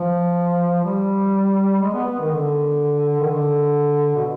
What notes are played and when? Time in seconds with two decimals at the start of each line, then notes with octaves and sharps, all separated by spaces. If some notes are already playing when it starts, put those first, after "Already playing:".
Already playing: F3
0.84 G3
1.82 G#3
1.94 B3
2.07 B3
2.19 D#3
2.32 D3
3.21 D#3
3.29 D3
4.16 B2